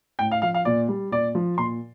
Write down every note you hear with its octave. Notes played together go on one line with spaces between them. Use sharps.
A2 G5
F5
F3 F5
F5
A#2 D5
G3
A#2 D5
F3
A#2 C6